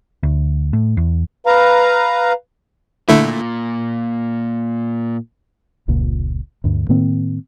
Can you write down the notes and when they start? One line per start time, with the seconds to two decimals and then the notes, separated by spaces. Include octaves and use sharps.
0.23 D2
0.73 A2
0.97 E2
1.46 B4 F5 A#5
3.09 A#2 D3 A3 E4
5.88 F1 C#2 A#2
6.64 D2 G2
6.89 A2 D#3 A#3 C4